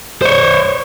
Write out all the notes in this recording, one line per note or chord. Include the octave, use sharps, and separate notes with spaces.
C5 C#5